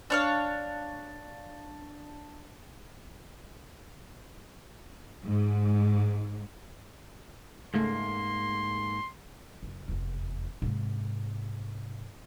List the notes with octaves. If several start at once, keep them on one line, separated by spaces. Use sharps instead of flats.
D4 C#5 F5
G#2
G#2 C#3 A3 A#3 C6
F#1
F1 E2
G#2 C3